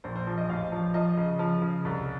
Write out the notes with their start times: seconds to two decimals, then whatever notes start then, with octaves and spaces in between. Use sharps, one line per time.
0.04 A#1 C5
0.16 C5
0.27 F3
0.38 D#5
0.49 A1 F5
0.72 F3
0.94 F3 D#5
1.17 C#3
1.39 F3
1.62 C#3
1.85 C2